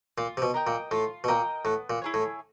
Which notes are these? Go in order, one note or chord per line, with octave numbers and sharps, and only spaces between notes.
A#2 F4
C3
B2
A#4 D#5 G5
A#2
A2 F4
B2
A#2 A#4 D#5 G5
A2 B3
A#2
E4 G#4 C#5
A2